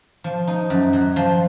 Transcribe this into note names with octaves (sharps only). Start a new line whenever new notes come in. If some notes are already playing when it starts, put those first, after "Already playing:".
F3
D#4
F#2
F#3
F3